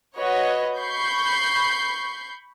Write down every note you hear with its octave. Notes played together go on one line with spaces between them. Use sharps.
F#4 B4 C#5 D#5
B5 C#6 G6 C7